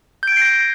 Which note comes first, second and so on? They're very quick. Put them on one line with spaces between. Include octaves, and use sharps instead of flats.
G6 D7 G#6 C7 A#6